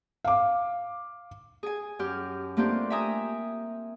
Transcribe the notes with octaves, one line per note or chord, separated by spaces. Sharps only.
F5 D6
G#4 G#5
F#2 G4 F6
A3 A#3 C4 D4 F4 G4
E5 G5 G#5 A#5 D#6 E6